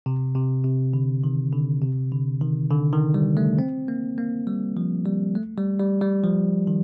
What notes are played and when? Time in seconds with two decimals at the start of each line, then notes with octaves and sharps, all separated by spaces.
0.06 C3
0.35 C3
0.64 C3
0.93 D3
1.24 D#3
1.53 D3
1.82 C3
2.12 D3
2.41 D#3
2.71 D3
2.92 D#3
3.14 G3
3.37 A3
3.59 C4
3.88 A#3
4.18 A#3
4.47 G3
4.77 F3
5.06 G3
5.35 A3
5.57 G3
5.80 G3
6.02 G3
6.24 F3
6.67 D#3